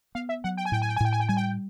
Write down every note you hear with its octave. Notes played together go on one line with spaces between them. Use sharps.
B3 F5
E5
F#3 F#5
G5
G#5
A2 G5
G#5
G5
G#5
A2 G5
G#5
G5
G3 G#5
G5